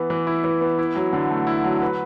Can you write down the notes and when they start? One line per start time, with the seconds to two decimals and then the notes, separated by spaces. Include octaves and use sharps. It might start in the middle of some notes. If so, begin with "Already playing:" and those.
Already playing: E3 B3
0.10 E3
0.27 E4
0.44 E3
0.61 B3
0.79 E4
0.96 F#3
1.13 D3
1.30 A3
1.47 E4
1.64 F#3
1.82 B4